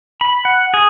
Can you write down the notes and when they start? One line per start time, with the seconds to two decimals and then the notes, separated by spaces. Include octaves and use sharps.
0.21 B5
0.45 F#5
0.74 G#4